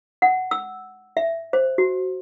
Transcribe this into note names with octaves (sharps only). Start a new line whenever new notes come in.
F#5
E6
E5
C5
F#4